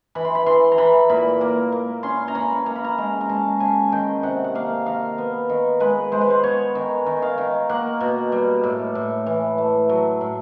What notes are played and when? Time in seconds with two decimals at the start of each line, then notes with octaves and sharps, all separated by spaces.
0.15 E3 B5
0.25 C6
0.35 B5
0.46 E3 C6
0.72 A#5
0.78 E3 B5
1.10 A#2 B5
1.41 A#3
1.72 A#3
2.03 C#4 C6
2.28 A#5
2.35 C#4 B5
2.66 A#3 A#5
2.76 B5
2.85 A#5
2.98 G#3 A#5
3.21 A#5
3.29 G#3 A5
3.60 C#3 G#5
3.92 D#3 G5
4.23 C3 F#5
4.44 F#5
4.55 A#3 F5
4.86 D#3 F5
5.18 B3
5.49 D#3
5.80 G#3 B4
6.12 G#3 C5
6.21 B4
6.30 C5
6.44 B3 C#5
6.75 D#3
7.06 D#3
7.22 F5
7.38 D#3
7.69 A#3 F#5
8.00 B2
8.32 G3
8.63 A2
8.95 A2
9.26 E3
9.58 A3
9.89 F#3
10.21 A2